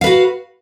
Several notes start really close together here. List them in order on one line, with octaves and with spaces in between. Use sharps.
F5 B4 F#4